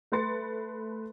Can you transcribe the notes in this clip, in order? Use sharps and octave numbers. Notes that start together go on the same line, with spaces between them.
A3 B4 C6 A6 C#7